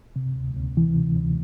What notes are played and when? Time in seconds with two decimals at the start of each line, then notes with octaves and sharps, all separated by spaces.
0.16 C3
0.36 D2
0.56 D2
0.77 E3
0.96 C3
1.17 D2